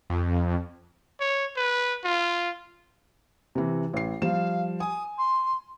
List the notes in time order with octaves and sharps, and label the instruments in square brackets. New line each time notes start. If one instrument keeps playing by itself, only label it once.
[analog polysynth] F2
[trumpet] C#5
B4
F4
[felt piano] C3 E3
A1 C7
[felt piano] F3 G3 E7 [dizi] F5
[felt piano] G#5 [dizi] D#6
[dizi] C6